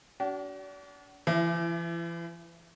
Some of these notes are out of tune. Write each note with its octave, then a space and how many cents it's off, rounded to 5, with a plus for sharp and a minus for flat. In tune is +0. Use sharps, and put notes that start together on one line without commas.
D4 -40 F#4 +35
E3 +40 E4 +20